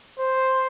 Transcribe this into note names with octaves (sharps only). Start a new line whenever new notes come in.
C5